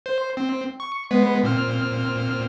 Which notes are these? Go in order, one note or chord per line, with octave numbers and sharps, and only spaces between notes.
C5
C4
C#6
G#3 B3 B4
A#2 C4 F6